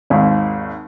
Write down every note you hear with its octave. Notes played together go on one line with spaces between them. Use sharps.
G#1 D#2